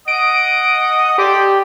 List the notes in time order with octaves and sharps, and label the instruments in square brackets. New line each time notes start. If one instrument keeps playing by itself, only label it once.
[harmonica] D#5 F#5 D#6 [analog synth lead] D7
[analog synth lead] G4 [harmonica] A4 D5 C6